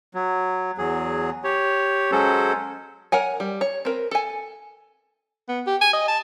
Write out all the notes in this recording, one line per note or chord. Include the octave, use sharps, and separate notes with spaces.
F#3
E2 F#3 G#4
G4 C#5
F#3 G#3 C#4 A4 C5
A#4 C#5 F#5 G#5
G3
C#5
C4 A#4 B4
A4 G#5
B3
G4
G#5
D#5
A5